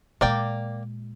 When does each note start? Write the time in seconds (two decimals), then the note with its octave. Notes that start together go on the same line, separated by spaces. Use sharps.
0.21 A#2 G#3 A#3 D5 G5